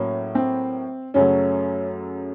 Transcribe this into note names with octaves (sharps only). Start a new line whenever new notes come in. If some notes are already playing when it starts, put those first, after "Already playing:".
Already playing: A2 F#3 A#3 C#4
C4
F#2 C#3 F#3 A3 C#4